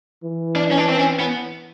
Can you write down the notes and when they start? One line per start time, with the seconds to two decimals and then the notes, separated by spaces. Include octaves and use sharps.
0.24 E3
0.56 D4
0.71 C#4
0.77 D4
0.89 C4
0.97 C#4
1.19 B3